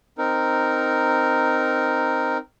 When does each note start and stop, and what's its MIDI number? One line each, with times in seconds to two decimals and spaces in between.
0.18 2.37 60
0.18 2.37 63
0.18 2.37 70